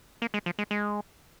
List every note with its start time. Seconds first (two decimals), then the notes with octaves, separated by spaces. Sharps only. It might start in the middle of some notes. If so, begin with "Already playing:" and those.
0.22 A#3
0.34 G#3
0.46 F3
0.59 G#3
0.71 G#3